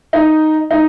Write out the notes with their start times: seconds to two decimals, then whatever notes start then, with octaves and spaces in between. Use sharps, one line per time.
0.13 D#4
0.71 D#4